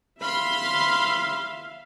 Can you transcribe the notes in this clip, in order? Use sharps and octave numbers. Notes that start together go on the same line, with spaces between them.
E5 F5 B5 C6